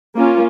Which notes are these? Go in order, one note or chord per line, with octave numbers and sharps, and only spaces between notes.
A#3 C#4 F4